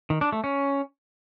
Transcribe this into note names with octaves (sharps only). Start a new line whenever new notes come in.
D#3
D4
A3
C#4